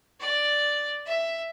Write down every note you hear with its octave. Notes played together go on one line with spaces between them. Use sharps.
D5
E5